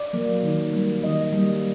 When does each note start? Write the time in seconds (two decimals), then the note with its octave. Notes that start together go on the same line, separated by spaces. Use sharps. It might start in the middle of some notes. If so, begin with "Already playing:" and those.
Already playing: D5
0.13 F#3 A#3
0.43 D#3
0.73 G3 A#3
1.03 D#3 D#5
1.33 G3 A#3